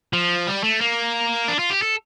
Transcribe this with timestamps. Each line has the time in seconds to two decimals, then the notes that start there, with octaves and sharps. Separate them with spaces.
0.13 F3
0.47 G3
0.64 A3
0.81 A#3
1.48 D4
1.59 F4
1.70 G4
1.82 A4